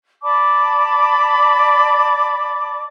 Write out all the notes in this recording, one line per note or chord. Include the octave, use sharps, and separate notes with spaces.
D5 A5 B5 D6